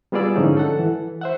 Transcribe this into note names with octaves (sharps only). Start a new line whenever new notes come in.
G3 B3 F4 G#4 D5 E6
G#2 D3 F3 C#4 D#4 E4
A4 F#5
E3
C5 E5 F#5